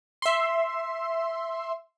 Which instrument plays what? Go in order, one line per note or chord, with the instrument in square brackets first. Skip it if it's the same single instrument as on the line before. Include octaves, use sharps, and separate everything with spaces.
[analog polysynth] E5 C6